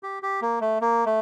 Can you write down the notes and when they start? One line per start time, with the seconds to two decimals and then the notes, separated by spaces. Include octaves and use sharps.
0.03 G4
0.23 G4
0.42 A#3
0.61 A3
0.81 A#3
1.06 A3